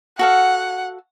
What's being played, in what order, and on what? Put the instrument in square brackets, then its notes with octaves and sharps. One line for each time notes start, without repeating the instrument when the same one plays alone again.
[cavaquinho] F#4 A4 F5 [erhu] F#5